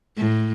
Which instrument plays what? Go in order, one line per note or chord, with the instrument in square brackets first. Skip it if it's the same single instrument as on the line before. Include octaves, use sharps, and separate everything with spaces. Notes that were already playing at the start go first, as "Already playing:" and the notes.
[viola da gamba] A2